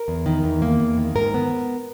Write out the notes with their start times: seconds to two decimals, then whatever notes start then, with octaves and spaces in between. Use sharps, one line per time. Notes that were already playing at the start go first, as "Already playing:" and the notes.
Already playing: A#4
0.08 E2
0.26 D#3
0.44 E2
0.62 A#3
0.80 E2
0.97 D#3
1.15 G#2 A#4
1.34 B3